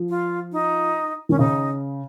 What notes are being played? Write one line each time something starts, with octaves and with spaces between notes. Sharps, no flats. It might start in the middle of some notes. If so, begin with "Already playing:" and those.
Already playing: F3
F4
D#4
D#3 C#4
C#3 D#4